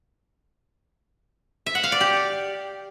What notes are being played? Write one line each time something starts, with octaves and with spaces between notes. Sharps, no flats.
E5
F#5
F5
D5
G4